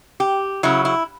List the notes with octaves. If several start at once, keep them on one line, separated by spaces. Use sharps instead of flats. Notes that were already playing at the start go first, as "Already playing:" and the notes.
G4
C#3 F#3 E4
E4